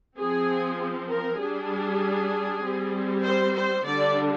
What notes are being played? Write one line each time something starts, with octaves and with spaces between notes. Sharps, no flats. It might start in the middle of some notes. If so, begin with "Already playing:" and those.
F3 C4 G#4
A#4
G3 D4 G#4
G3 C4
C5
C5
D3 G3 D4 D5